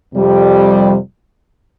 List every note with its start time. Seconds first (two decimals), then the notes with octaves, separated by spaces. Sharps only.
0.13 F2 C3 G3